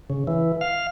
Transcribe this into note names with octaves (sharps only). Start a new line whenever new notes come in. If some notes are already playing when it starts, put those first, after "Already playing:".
C#3
E3
F5